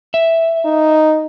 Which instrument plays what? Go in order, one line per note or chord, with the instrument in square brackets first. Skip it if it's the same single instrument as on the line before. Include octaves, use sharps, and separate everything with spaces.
[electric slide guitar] E5
[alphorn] D#4